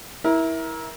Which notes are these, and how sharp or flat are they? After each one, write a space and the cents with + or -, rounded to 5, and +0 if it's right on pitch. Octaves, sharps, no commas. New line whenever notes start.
E4 -15 A#4 +20